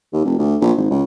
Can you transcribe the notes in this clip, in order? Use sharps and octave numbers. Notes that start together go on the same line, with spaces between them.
D#2
F1
D2
A#1
G#1
C#2